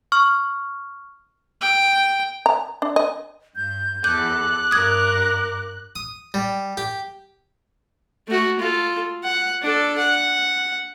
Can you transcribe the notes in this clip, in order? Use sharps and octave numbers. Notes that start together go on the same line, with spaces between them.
C#6 F6
G5
A#5
D4
D#5
G2 G6
E2 A4 D6 F#6 G6
G2 A#4 D#6 G#6
D#6
G3
G4
A3 F#4
F4 A4
F#5
D4 A4
F#5